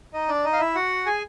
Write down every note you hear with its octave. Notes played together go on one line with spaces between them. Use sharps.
D#4 D#5
D4 D5
D#4 D#5
F5
E4 E5
F#4 F#5
G#4 G#5